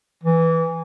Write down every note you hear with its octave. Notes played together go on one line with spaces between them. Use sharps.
E3